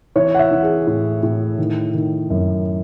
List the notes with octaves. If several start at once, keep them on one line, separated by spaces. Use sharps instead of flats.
E3 C#5
F#5
E5
E3
G#4
A2
A2
D#3
D#3
F#2